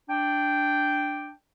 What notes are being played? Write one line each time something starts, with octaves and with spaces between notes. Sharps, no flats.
D4 G5